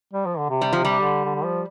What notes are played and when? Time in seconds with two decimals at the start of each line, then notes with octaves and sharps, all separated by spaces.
0.13 G3
0.26 F3
0.38 D3
0.50 C3
0.61 G3
0.73 C3 F3
0.85 G3
1.00 D3
1.25 D3
1.35 D3
1.45 F3